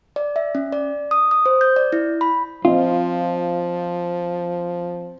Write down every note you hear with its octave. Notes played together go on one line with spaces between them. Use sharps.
D5
E5
C#4
D5
D#6
D#6
C5
G6
D5
E4
B5
F3 C4 F4 D#5